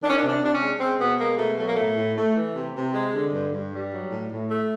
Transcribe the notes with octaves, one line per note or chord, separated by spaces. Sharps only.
D#3 D4
C#4
D4
C3
D4
C3 D4
C#4
G#3
G#3 C4
B2 B3
G#3 A#3
B2 A3
F#3 A3
A#3
A2 A3
A2
A3
E3
C3
C3
G#3
D3
G2
G2
G3
F#3
A2
A2
A3